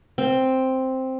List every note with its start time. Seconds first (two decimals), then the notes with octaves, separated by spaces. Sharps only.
0.18 C4